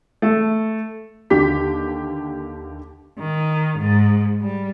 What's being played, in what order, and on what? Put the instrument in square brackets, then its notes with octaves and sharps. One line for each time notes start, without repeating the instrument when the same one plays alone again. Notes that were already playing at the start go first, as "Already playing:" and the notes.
[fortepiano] A3
[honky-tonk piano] D#2 D3 G4 B6
[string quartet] D#3
G#2
G3